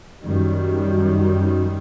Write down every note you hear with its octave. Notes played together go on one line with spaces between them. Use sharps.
F#2 D#3 G3